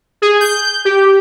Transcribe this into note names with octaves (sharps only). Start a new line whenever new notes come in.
G#4
G6
G4